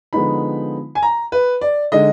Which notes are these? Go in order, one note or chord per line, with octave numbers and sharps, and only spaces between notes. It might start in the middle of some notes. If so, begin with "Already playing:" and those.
D3 F3 G#3 B3 D#4 B5
G#5
A#5
B4
D5
D3 G#3 D#4 D#5